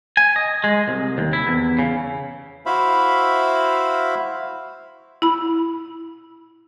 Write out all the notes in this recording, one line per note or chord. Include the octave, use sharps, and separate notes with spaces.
G#5
D#5
G#3
C2
D#2
E4
E2
C#3
E4 F#4 C5 E5 F5 B5
E4 B5